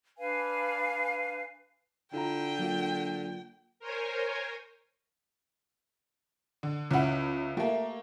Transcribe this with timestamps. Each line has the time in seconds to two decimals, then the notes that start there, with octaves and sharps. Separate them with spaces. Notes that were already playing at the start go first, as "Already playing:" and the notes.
0.18 D4 B4 F5 G#5
2.13 D3 E4 F4 G5 A#5
2.59 F#3 A#3 F4
3.79 A#4 C5 C#5 G#5
6.63 D3
6.91 C#2 C#4 E4 F#5
7.57 A3 A#3 G4 E5 A5